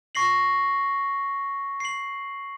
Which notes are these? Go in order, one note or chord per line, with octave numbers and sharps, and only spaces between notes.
C#6 A#6 C7 F#7
C7 F#7